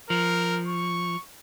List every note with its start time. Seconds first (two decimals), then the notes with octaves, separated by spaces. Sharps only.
0.10 F3 A#4
0.67 C#6